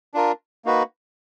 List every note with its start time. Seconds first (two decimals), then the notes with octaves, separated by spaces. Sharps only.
0.14 D4 F4 A#4
0.65 A#3 D#4 F#4 B4